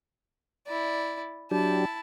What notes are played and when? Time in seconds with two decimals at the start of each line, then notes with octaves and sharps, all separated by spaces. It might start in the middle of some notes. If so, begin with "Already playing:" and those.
0.66 E4 D5
1.51 F#3 D4 E4 G4 A5